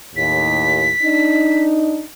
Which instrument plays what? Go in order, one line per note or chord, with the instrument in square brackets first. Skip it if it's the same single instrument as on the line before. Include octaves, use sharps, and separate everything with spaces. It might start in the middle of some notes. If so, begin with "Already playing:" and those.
[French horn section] D#2 A2 [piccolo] B6
[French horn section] D4 D#4